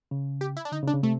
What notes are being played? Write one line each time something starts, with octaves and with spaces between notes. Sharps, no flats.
C#3
G4
E4
D4
D3 D#4
C#3
D4
C#3
C3 A3